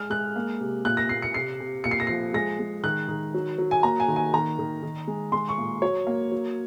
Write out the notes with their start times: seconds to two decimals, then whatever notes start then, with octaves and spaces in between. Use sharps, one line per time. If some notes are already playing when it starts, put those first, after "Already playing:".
Already playing: G#3 F6
0.10 G#3 F#6
0.36 A#3
0.60 C3
0.85 A#2 F#6
0.97 A#6
1.09 A#2 C7
1.22 C#7
1.34 C3 C7
1.60 C3
1.84 A#2 C#7
1.91 C7
2.00 A#6
2.07 F3 C7
2.34 G#3 A#6
2.59 G#3
2.83 D#3 F#6
3.08 D#3
3.34 F#3
3.58 F#3
3.71 G#5
3.83 A#3 A#5
4.00 G#5
4.08 D#3
4.16 G#5
4.33 D#3 A#5
4.59 D#3
4.83 D#3
5.07 G#3
5.32 G#3 C6
5.49 C#6
5.58 A#2
5.82 F#3 C#5
6.07 A#3
6.32 F#3